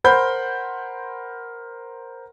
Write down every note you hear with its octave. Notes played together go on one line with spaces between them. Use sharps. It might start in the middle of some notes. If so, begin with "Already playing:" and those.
A#4 C5 F#5 B5 C6 G6